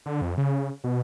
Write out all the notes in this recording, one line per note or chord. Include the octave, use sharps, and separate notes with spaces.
D3
F2
C#3
B2